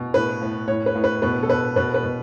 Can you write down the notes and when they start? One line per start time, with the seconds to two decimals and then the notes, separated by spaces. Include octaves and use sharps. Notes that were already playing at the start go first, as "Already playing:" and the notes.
Already playing: B2
0.14 A2 B4
0.41 A2
0.68 A2 C#5
0.86 B4
0.95 A2
1.04 B4
1.22 B2 B4
1.43 A4
1.49 B2 B4
1.76 B2 B4
1.94 B4
2.03 B2